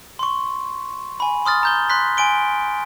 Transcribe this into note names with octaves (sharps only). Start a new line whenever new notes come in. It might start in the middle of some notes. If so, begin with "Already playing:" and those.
C6 C#6
G#5 B5
C6 D#6 F6 A6
A#5 G6 G7
C6 F#6 B6
G#5 C6 D7 G7